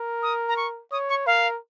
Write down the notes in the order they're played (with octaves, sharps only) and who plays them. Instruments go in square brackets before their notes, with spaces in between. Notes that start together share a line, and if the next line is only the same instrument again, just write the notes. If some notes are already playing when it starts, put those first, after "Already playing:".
Already playing: [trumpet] A#4
[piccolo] D#6
A#5
C#6
[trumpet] C#5 [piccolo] D#6
[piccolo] C#6
[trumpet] A#4 [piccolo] F5